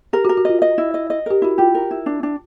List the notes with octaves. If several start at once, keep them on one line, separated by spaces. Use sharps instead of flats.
G4 A#4
F#4
A#4
F#4
F4 D#5
D#5
E4
D#5
D#5
G4 A#4
E4 F#4
F4 G4
A#4
E4
D4
D4